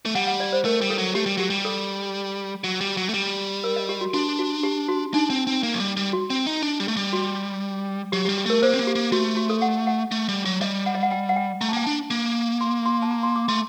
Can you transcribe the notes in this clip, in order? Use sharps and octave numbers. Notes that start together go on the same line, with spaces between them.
A3
G3 F#5
F#5
D5
C5
A3 A#4
G3
A4
F#3
A3 G4
G3
F#3 G4
G3
A4
F#3
G3
F#3
A3
G3
A#4
D#5
G4
F#4
D4 F#4
F#4
G4
F#4
D4 D#4
C4
C4
A#3
F#3
G3
G3
F#4
C4
D#4
D4
G3
A3
G3
F#4
F#3 G4
G4
G3
G4
A3 A#4
A#3 C5
C4
A#3
G4
A#3
A3 F#4
F#4
A4
F#5
F#5
A3
G3
F#3
G3 D#5
F#5
D#5
F#5
G5
F#5
G5
A3 A#5
A5
A#3 G5
D4 A5
A#3
C6
C6
A5
A#5
C6
D6
A3 C6